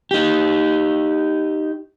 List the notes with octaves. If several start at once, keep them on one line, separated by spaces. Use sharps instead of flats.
D#4 G4